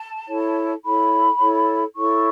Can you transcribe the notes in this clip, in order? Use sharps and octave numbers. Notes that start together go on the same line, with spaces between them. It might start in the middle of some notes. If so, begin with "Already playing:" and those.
Already playing: A5
E4 A4 C#5
E4 A4 C#5 B5
E4 A4 C#5
E4 A4 C#5 C#6